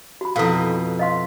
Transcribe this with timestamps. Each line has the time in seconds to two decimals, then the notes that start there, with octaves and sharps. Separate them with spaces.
0.21 F#4 B5
0.36 F2 B2 E4 A4 F5
0.99 D#5 F5 C6